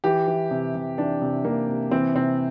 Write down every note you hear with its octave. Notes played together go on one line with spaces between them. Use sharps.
E3 G4
E3
C3
C3
E3 D4
C3
C3 A#3
C3
E3 C4
C3 C4